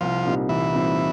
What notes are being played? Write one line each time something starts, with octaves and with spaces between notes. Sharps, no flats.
C2 F3
A#2 G3 C4 D#4
C2 E3
A#2 G3 C4 D#4